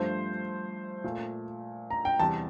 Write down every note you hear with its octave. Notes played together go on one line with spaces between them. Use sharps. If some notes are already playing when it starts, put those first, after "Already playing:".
Already playing: G2 F3 A3 C5
A#2 A3
A#5
G5
E2 C3 G3 A5